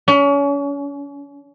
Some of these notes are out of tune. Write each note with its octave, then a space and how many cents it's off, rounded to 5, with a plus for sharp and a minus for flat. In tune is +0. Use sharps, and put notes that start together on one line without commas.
C#4 +35